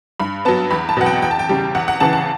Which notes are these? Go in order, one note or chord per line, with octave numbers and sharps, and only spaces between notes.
G2 B5
F#3 B3 A5
E2 B5
A5
B2 F#3 B3 F#5
G5
E2 G5
A5
G5
C#3 G3
E2 F#5
F#5
C#3 E3 A5
A5